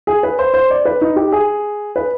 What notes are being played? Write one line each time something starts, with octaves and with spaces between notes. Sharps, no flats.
G#4
B4
C5
C5
D5
B4
D#4
G4
G#4
B4